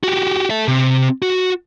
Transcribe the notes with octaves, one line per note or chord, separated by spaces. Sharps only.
F#4 G4
A4 E5
C3 C4
F#4